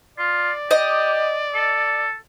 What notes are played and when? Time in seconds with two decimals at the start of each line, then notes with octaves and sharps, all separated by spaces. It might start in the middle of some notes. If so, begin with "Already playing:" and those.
0.18 F4 D5
0.71 G4 D#5
1.55 A4